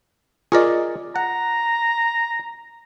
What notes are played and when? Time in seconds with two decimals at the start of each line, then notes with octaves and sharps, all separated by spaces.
0.52 F4 G#4 A#4 D5 D#5
1.16 F#5 A#5